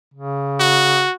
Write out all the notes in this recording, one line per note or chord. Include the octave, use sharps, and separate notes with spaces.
C#3
F#4